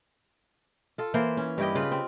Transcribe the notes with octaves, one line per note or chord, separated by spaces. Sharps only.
F4 A4
E3 A#3 C5
C#4
G2 E4 G4 D#5
C#3 F4 B4
C4